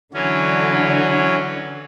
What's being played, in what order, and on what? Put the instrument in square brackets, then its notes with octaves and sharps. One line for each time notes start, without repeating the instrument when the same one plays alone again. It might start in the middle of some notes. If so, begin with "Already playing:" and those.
[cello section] D3 [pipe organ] E3 F#3 C#4